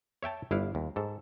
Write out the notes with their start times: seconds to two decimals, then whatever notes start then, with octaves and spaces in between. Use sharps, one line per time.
0.23 C#5 E5 G5 A5
0.51 G1 E4 B4 F5
0.75 D#2
0.96 G#2 A4